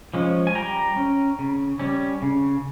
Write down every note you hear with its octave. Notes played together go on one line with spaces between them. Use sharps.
F3 G#3 C#4
G#5
G3 G5 A#5
C#4
C#3
G3 C#4
C#3